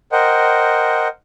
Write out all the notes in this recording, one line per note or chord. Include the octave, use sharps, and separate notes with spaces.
A#4 C5 D#5 F#5 G5